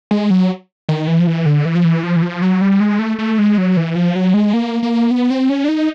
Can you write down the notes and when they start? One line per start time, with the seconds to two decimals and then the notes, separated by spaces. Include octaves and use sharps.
0.11 G#3
0.30 F#3
0.89 D#3
1.08 E3
1.20 F3
1.27 E3
1.46 D3
1.65 E3
1.75 F3
1.85 E3
2.03 F3
2.16 E3
2.22 F3
2.42 F#3
2.61 G3
2.80 G#3
2.99 A3
3.19 A3
3.39 G#3
3.58 F#3
3.77 E3
3.95 F3
4.16 F#3
4.34 G#3
4.53 A#3
4.83 A#3
5.11 B3
5.30 C4
5.49 C#4
5.64 D4
5.68 D#4